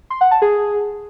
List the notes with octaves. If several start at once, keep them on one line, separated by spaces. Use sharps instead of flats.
C6
F#5
A5
G#4